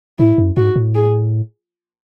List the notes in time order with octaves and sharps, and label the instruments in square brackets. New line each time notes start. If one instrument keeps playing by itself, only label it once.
[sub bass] A2 [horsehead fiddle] E4
[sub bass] F#2
[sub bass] G#2 [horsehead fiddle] F#4
[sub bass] A2
[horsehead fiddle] G#4